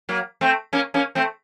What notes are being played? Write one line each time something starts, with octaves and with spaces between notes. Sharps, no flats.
F#3 A#3
A3 C4
A#3 C#4
A#3 C#4
A3 C4